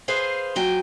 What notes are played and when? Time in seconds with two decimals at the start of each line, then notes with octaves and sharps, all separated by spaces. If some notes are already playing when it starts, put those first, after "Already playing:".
0.08 G#4 B4 C5 F5
0.56 F3 F#3 G5 G#5